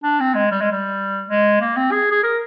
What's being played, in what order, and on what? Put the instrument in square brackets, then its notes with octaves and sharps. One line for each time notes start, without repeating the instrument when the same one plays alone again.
[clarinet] D4
C4
G#3
G3
G#3
G3
G#3
A#3
C4
G#4
G#4
A#4